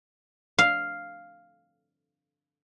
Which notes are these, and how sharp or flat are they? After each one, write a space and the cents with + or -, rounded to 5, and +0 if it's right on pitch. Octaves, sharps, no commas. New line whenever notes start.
F5 +0